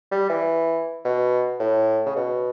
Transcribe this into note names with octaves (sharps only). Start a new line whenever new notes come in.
G3
E3
B2
A2
C#3
B2